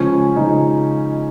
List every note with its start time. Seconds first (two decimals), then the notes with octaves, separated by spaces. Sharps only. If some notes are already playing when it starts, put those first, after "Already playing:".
Already playing: C#2 C#3 F3 C#4
0.36 C#2 C#3 F3 D#4